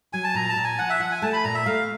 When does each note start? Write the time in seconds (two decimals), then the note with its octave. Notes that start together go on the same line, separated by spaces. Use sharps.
0.13 F#3 G#5
0.24 A5
0.35 A#2 A#5
0.49 A5
0.56 A#2
0.64 G#5
0.79 F3 F#5
0.89 E5
1.00 F3 F#5
1.11 G#5
1.22 A3 A5
1.33 B5
1.44 A#2 A#5
1.55 E5
1.66 A3 F5